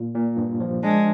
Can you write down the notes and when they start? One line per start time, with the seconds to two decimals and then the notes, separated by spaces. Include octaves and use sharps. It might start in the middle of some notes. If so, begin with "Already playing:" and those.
Already playing: A#2
0.15 A#2
0.37 G2
0.60 F3
0.83 G#3 D4